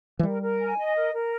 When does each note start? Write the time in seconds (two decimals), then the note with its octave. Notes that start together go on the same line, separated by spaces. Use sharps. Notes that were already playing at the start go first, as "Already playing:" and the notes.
0.19 E3
0.23 G3 A#4
0.42 A#4
0.60 G#5
0.77 D#5
0.96 A#4
1.13 A#4